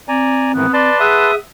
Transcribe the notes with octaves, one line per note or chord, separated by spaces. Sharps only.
C4 D5 G#5 A#5
G#2 D#3 E3 B3
B4 D5 A5 C6
G#4 E5 F#5 D#6